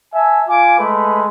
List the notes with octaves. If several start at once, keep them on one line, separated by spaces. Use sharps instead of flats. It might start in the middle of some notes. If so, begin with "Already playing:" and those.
E5 G#5 A5
F4 G#5 D6
G#3 A3 B4